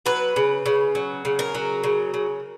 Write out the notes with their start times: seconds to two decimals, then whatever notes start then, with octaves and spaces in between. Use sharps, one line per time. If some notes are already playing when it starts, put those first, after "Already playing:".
0.06 F#3 B4
0.36 C#3
0.66 C#3
0.95 F#3
1.25 C#3
1.39 A#4
1.54 F#3
1.84 C#3
2.14 C#3